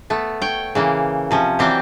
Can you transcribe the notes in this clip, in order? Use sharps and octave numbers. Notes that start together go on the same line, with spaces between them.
A3 B3
C#5 G5
C#3 E3 A#3
C3 F3 C#4
E3 F#3 G3 C4 G4